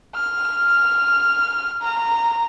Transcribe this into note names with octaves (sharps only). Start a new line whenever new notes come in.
F6
A#5